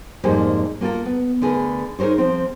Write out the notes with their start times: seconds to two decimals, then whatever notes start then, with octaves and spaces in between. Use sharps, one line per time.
0.24 F2 G#2 G3 A#3 G4 G#4
0.81 A#3 F4 G4 A4 A#4
1.05 B3
1.42 D3 A3 G#4 A#4 B4
1.99 D#4 G#4 A#4 C5 C#5
2.18 F3 C4